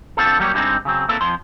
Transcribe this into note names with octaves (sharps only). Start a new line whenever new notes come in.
D3 C4 F4 A4
F#3 G3 A#3 G4 C#5
G2 G3 G#3 A#3 C4 D#4
C#3 F#3 C4
A#3 C4 E4 A4 B4
F2 F3 C6